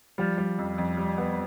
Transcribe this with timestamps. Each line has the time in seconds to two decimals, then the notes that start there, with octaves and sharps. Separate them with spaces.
0.18 F3 G3
0.38 G3
0.58 F2
0.78 F2
0.97 G3
1.18 B3